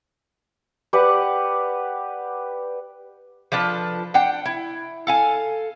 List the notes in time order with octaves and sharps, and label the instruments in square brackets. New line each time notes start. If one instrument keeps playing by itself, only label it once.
[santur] G4 B4 D5 F#5
[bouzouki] F3 D4 A4 B4
D4 F#5 G5
E4
A4 F5 G#5